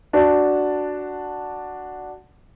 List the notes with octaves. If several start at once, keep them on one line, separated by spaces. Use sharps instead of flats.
D4 F#4 F#5 A5